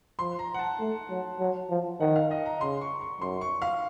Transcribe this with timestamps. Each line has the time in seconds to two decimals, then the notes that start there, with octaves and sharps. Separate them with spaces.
0.19 F3 C6
0.39 A#5
0.54 F#5
0.59 A5
0.80 A3
1.10 F#3
1.40 F#3
1.70 F3
2.00 D#3 F#5
2.16 F5
2.31 D#5
2.46 A#5
2.61 C#3 C6
2.81 C#6
3.01 C#6
3.21 F#2 C6
3.41 C#6
3.62 F5